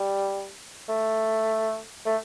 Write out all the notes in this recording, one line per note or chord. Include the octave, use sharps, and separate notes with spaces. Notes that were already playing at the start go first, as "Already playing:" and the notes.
Already playing: G3
A3
A3